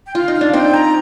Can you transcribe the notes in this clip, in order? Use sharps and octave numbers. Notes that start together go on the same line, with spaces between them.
G5
F4 F5
D#4
F5
D4
C4 D#4 G5
A#5